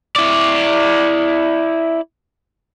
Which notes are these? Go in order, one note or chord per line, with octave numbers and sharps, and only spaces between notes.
E4 D5